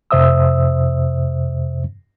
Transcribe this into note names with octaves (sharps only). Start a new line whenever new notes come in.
F2 C3 C5 E5 D#6 E6